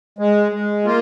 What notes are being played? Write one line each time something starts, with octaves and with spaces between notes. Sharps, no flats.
G#3
G#3
A#3 F4